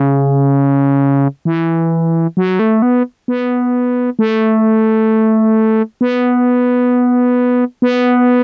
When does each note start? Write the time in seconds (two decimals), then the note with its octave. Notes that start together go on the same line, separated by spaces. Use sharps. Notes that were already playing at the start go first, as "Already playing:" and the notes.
Already playing: C#3
1.45 E3
2.37 F#3
2.59 A3
2.82 B3
3.28 B3
4.19 A3
6.01 B3
7.82 B3